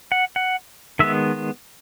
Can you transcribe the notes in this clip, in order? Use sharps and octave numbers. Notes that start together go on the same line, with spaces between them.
F#5
F#5
D#3 G#3 B3 E5